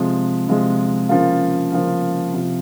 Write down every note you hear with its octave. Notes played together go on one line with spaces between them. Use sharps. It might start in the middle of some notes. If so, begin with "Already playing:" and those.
Already playing: C3 F3 G#3
C3 F3 G#3
C#3 F3 A#3 F4
C#3 F3 A#3 F4
C3 F3 C4 F4